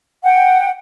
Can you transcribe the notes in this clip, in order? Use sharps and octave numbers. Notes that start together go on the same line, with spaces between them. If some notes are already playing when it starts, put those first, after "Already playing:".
F#5 G5